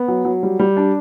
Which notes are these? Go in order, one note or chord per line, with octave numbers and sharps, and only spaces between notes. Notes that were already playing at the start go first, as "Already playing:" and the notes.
Already playing: B3
F#3
F#3
G3
G3
D4